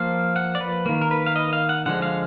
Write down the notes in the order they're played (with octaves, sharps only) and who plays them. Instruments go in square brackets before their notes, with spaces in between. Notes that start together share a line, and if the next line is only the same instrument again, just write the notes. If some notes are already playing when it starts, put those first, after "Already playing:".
Already playing: [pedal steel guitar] F3 A#3 F5
F#5
D5
B4
D#3 A#3
A#4
B4
F5
D#5
F5
F#5
D3 F3 G#3 F#5
F5